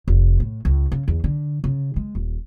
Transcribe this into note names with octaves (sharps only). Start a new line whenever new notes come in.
F1
A2
C#2
C#3
E2
D3
C#3
G#3
D#1